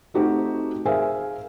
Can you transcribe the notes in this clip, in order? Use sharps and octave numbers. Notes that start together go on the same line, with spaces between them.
A3 C4 D#4 F#4 G4
G#4 A#4 C5 E5 F5 G#5